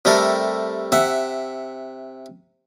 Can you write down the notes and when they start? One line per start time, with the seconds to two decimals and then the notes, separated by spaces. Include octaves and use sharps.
0.05 C3 G3 A3 A4 A#4
0.92 C3 E5 F#5